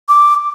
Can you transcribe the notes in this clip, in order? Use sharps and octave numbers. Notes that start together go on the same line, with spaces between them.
D6